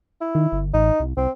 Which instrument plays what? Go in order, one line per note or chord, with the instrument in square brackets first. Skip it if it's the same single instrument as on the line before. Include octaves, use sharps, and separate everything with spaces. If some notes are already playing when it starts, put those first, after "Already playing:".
[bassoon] E4
[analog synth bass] D#3
G1
[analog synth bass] A1 [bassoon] D#4
[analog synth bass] C2
[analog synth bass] C2 [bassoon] C4